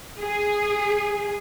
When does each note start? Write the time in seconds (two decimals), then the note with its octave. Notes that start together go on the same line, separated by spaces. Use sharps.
0.20 G#4